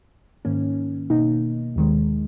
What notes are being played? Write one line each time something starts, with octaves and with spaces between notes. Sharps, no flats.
G#2 D#3 A#3 C#4
B2 A#3 D#4
D#2 D#3 G#3